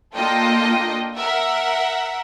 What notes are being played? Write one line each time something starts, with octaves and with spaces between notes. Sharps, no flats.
A#3 D4 F4 A4 D#5 G5
A#4 E5 F#5